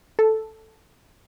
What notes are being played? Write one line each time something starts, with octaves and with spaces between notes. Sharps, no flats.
A4